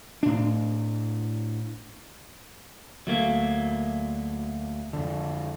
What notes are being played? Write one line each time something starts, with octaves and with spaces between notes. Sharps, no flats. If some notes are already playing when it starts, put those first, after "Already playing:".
A2 D4
D2 F#3 A3 A#3
F2 D3